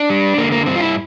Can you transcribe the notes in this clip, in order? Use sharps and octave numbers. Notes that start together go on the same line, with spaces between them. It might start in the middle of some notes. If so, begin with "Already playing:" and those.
Already playing: D4
G3
D3 A#3
A#3
G2 C4
F4
E4